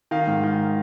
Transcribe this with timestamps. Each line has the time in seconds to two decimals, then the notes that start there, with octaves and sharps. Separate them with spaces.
0.11 D#3 F5
0.27 G#2
0.43 D#3